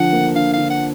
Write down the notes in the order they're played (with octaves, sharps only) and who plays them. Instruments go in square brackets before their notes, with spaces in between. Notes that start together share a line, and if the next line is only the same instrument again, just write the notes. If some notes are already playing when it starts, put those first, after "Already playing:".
Already playing: [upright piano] D3 F3 [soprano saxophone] F#5
[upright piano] A#3
[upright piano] D3 [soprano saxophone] F5
[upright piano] D3 [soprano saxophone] F5
[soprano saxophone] F#5